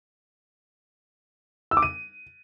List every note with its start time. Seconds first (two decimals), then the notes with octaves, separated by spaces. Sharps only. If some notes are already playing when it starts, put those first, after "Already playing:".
1.71 E6
1.77 D6
1.82 D#7